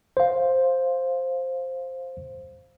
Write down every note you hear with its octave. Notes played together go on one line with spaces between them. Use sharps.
C5 F5